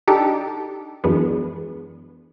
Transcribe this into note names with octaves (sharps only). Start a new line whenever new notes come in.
D4 D#4 G4 A4
F#2 E3 G#3 B3 D4